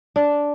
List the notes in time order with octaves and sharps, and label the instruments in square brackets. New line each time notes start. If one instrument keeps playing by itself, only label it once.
[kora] D4